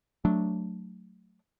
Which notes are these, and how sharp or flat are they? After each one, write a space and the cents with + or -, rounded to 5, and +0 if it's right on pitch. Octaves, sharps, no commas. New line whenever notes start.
F#3 +0 A3 +0 D4 +0